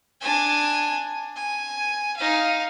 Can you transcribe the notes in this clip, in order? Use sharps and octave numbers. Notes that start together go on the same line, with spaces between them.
D4 G#5
G#5
D#4 F5